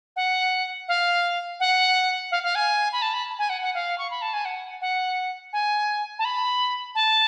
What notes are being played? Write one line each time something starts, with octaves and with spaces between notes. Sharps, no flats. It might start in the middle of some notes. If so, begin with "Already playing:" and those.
F#5
F5
F#5
F5
F5
G#5
B5
A5
B5
G#5
F#5
F#5
F5
C#6
B5
A5
G#5
F#5
F#5
G#5
A5
B5
A5